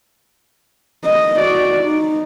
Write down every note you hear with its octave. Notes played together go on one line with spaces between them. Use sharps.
D#5
F#4 D5
D#4